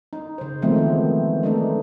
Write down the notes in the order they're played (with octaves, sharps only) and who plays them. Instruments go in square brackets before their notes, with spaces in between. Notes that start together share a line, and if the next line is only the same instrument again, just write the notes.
[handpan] D#4
C#3 C5
D#3 F3 G#3 A3 B3 C4
E3 F3 G#3
G#3 A3 D4 D#4 A4